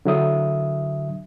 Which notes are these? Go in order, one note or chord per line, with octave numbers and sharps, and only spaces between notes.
D3 F#3 E5 D#6